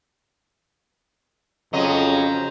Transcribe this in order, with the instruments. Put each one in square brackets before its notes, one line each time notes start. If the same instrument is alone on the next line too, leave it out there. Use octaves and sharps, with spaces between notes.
[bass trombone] F2 [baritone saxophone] C#3 [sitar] F#3 D#5 [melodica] C5 A#5